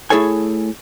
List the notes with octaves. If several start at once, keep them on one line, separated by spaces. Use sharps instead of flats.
A3 E4 G#4 A4 C#5 G#5